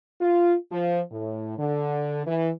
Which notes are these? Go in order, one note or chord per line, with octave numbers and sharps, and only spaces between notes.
F4
F3
A2
D3
E3